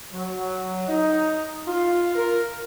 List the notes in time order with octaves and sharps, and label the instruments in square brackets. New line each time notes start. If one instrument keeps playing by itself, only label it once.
[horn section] F#3
D#4
F4
A#4